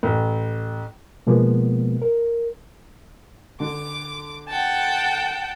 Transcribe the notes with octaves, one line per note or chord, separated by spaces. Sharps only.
A1
B2 F3 G#3 A#3 B3
A#4
D3 D6
F#5 G5 A5